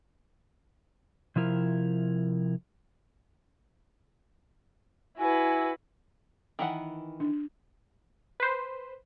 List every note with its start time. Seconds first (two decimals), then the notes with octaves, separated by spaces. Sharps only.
1.36 C3 F3 E4 A#4
5.18 E4 F#4 B4 G#5
6.59 D#3 E3 F#5
7.20 D4
8.40 B4 C5